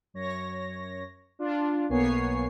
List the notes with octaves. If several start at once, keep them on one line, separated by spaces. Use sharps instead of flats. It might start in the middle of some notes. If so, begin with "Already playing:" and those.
F#2 C#5 A#6
D4 F4
B1 A#3 B3 C#5 G#5 C7